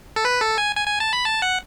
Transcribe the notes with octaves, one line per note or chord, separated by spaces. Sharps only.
A4
B4
A4
G#5
G#5
G#5
A5
B5
A5
F#5